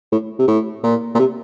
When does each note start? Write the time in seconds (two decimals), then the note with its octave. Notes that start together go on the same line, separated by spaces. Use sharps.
0.12 A2
0.39 C3
0.48 A2
0.84 A#2
1.15 A#2
1.19 C3